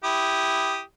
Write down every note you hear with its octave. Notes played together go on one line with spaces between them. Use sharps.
E4 G4 D#6